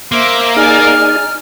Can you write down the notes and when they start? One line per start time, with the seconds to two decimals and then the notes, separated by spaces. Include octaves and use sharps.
0.12 A#3 C5 E5
0.56 D#4 G#4 D5 G#5 F6